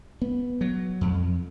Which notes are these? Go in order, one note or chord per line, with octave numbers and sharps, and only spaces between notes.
B3
F#3
F2